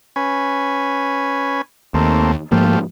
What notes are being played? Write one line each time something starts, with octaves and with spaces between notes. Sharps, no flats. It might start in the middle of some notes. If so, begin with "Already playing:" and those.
C#4 B4 G#5
D#2 A3 A#3 C4
G#2 F3 A3 A#3 F4 G4